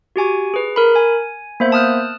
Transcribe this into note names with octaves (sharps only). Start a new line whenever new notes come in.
F#4 G4 G#5 C#6
G#4 B4
A#4 B5
G#5
A#3 B3 C5 E5 G6
A5 D#6 F6 F#6